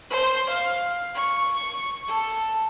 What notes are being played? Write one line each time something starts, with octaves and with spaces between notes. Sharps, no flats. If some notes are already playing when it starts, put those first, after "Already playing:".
C5
F5
C#6
A4